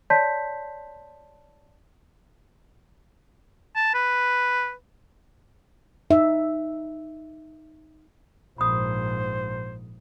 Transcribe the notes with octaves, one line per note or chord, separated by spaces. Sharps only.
C#5 D5 A5 C6 G6 B6
A5
B4
D#4 E5
A#1 G#2 C5 B5 D#6